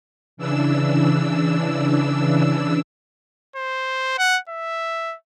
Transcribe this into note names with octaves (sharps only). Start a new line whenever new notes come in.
C#3 E3 D4 E6
C5
F#5
E5